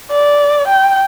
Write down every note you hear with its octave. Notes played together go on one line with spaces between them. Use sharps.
D5
G5